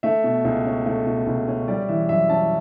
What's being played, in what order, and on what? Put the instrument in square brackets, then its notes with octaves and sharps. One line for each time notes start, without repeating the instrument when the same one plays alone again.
[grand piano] A3 E5
B2
C#2
C#4
A3
B2
C#2
C#4
G3 D5
E3 E5
F#2 E5
C#4 A5